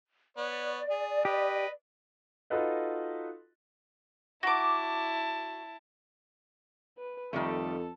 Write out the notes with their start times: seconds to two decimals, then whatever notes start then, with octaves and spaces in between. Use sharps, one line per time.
0.37 B3 C#5 D5
0.90 G#4
1.25 G4 B4 D#5
2.50 D#4 F4 F#4 A4 B4 D#5
4.43 E4 F#4 A5 D6
6.98 B4
7.33 F2 D#3 G3 A3 A4